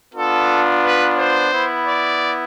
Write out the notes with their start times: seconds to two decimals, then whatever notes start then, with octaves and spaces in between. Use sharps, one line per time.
0.14 B3 D4 F4 A4
0.83 B4
1.17 C5
1.51 B3 E4
1.86 D5